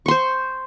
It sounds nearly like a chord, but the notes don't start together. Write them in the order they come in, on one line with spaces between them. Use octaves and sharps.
C#6 C6 C5